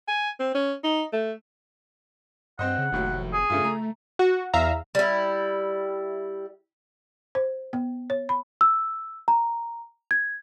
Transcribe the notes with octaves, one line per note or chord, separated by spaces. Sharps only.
G#5
C4
C#4
D#4
A3
G2 C4 C5 D#5 F#5
C#3
F1 D#2 A2 F#3
G#4
G2 C#3 A3 F4
A3 A#5
F#4
E2 E5 F5 A#5
G3 E4
C5
B3
C#5
B5
E6
A#5
G#6